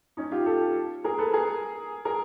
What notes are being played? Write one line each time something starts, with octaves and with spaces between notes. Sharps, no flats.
C#4 D#4
F4 G4
G4 A4
G#4 A#4
A4 B4
G#4 A#4
G#4 A#4